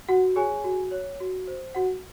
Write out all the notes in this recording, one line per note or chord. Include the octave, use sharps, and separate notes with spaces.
F#4 F#5
G#4 C#5 G#5
F#4
C#5
F#4
C5
F#4 F#5